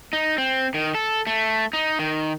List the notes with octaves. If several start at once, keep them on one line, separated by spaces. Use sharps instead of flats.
D#4
C4
D#3
A4
A3
D#4
D#3